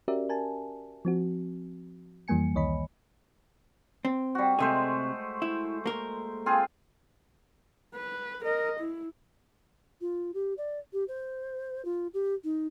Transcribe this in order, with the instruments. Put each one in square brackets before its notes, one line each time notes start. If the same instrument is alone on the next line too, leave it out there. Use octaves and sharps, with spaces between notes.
[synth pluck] C#4 F#4 G4 A#4 D5 E5
A#4 G#5 A5
F3 C4 F#4
F2 E3 G3 A#3 G#5 C#7
C#2 D#3 C#5 D#5 B5
[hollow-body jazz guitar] C4
[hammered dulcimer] G3 F#4
[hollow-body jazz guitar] C3 G#4 [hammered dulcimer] G#3 A3 C5
[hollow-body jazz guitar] E4
A#3 A#4
[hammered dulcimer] C4 F4 G#4
[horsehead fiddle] B4
A#4 D#5
E4
[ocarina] F4
G4
D5
G4
C5
F4
G4
D#4